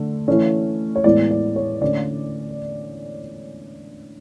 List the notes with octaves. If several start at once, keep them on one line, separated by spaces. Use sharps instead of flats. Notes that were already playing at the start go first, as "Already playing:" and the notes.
Already playing: D3 A3
E3 A3 C#4
C#5
A2 E3 G#3 B3 D5
D5
C#5
D3 A3 C#4 D5